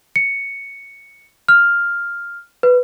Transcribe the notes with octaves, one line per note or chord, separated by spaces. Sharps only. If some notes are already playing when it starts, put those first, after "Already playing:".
C#7
F6
B4